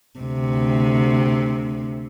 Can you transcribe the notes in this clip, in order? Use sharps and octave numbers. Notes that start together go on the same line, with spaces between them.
D2 C3